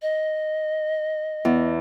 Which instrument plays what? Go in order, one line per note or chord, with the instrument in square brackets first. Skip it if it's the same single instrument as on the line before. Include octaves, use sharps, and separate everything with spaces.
[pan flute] D#5
[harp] E2